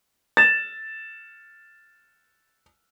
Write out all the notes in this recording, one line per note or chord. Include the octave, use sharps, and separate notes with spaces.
A6 E7